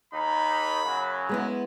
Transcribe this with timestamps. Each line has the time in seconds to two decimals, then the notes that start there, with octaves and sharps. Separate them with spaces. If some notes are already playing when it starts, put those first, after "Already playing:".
0.13 D#2 D#4 B5
0.84 F#2 C#3 F#3
1.29 G#3 B3 E4